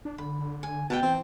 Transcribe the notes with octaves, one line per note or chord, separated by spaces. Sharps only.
D4
D3 B5
D3
G#5
B2 G5 A5
E3 C4